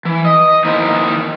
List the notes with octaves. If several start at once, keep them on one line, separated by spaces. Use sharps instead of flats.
E3
D#5
D#3 A#3 B3 D#4 E4 C5